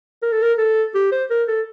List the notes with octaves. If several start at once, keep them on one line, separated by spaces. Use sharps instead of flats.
A#4
A4
A#4
A4
G4
C5
A#4
A4